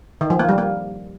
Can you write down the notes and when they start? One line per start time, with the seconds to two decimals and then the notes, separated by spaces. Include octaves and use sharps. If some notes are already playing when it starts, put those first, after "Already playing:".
0.21 D#3
0.30 F3
0.39 A#3
0.49 G3
0.58 A#3